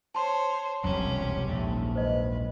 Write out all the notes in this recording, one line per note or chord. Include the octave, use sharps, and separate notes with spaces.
C5 C#5 A5 C6
E1 C2 F2 F#3 C#4 G4
A#1 D#2 G#2 A3
B4 C5 D#5